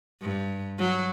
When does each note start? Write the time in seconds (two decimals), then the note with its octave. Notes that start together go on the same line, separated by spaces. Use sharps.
0.22 G2
0.78 F#3